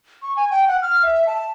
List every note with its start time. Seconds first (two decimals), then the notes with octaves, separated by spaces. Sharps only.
0.22 C#6
0.37 G#5
0.51 G5
0.68 F#5
0.82 F6
1.03 E5
1.27 A5